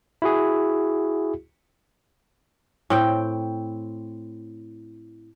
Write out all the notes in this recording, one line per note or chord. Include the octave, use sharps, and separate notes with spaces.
E4 F#4 G#4
A2 C4 G5